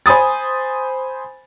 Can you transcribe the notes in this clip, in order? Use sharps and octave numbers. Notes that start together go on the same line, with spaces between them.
C5 G#5 B5 D#6 A6